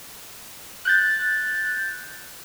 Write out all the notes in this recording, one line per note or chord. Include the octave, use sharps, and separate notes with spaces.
F#6 G6 A6